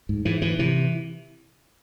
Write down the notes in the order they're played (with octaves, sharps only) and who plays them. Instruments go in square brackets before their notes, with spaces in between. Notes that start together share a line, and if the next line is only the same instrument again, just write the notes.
[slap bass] G#2
G#2 E3
G#2 E3
C3 E3